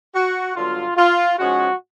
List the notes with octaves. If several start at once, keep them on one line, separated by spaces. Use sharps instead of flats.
F#4
G2 D3 F#3 B3 F4
F4
G#2 F3 G#3 C#4 F#4